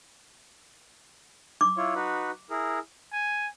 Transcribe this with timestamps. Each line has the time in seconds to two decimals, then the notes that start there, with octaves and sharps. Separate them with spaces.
1.61 D6
1.77 E4 F4 C#5
1.95 D#4 F#4 B4
2.50 E4 G#4 A#4
3.13 G#5